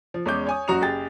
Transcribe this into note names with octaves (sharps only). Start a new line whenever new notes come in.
F3
E2 G#3 C#4 D6 G6
C#5 G#5 D#6
F#1 F#3 F#4 A#5 D#6 F7
F#1 G4 G#4 G5 A6